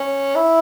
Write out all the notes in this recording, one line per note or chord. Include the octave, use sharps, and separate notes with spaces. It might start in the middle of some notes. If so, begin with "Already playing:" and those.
Already playing: C#4
E4